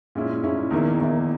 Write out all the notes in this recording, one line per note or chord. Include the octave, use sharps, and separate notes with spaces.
A#2 G#3 C#4 E4
A#2 G#3 C#4 E4
E2 D#3 A#3 E4
E2 D#3 A#3 E4